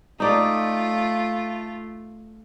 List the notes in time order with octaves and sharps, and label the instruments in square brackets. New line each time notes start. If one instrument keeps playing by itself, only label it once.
[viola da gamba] A3 F4 [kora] D#4 D5